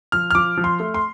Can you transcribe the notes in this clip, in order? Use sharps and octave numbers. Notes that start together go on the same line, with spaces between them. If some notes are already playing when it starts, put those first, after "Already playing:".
F3 F6
F6
F3 D6
F3
C6
A3
C6